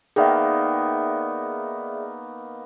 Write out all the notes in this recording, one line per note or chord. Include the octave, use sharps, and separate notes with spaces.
D#3 A#3 B3 G#4 D5 E5